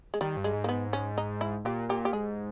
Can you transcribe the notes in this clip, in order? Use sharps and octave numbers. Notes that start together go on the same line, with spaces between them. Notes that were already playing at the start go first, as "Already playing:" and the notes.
G#3
D#3 G3
G2
G#3
G#2
A#3
B3
C#4
D#4
E4
A#2 G4
A#2 G4
G4
G#2 G#4